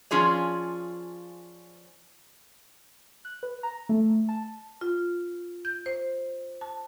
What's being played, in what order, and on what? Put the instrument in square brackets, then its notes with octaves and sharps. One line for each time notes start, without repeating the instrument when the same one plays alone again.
[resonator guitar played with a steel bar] F3 C#4 F4 G#4 D5
[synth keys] F#6
B4
A#5
A3
A5
[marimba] F4
G6
C5
A5